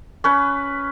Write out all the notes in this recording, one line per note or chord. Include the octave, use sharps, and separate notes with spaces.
C#4 B4